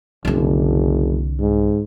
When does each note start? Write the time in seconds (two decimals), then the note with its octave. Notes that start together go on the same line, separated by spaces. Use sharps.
0.25 F#1 C2 D3
1.40 G#2